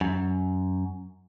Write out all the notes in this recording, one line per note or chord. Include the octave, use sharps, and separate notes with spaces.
F#2